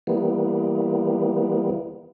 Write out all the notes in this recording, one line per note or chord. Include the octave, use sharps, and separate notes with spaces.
E3 G3 A#3 B3